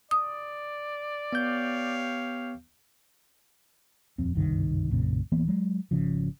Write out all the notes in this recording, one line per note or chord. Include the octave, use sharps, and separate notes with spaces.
D5 D#6
B3 G4 C#5 F5 G6
D#1 F2 C4
F#1 C2 G2 D#3
B1 F#2 A#2 C#3
D1 E3 A#3 B3
F#3 G#3
G#1 C#3 F3